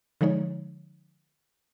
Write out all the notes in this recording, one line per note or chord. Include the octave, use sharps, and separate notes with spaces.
D3 F3 G#3 D#4 C#5